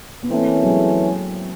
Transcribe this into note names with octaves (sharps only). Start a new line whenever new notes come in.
B3
E3 A3 A#3 C4 C#4
F#3 G#3